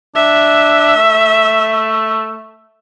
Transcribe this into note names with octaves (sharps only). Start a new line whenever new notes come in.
D4 E5
A3